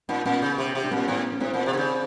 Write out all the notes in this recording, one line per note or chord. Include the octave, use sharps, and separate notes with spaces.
A#2 C#4 D#4
A#2 B3 C#4
C#3
C3
C3
D4
A#2 B3 C#4
A2 C4
B3 C#4
C#4
A2 C4 D4
A#2
C3
D3
C#3